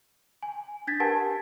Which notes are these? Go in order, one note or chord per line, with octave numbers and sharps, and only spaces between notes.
G#5
D4 G#6 A6 B6
G4 A#4 B4 F#5 G#5 A5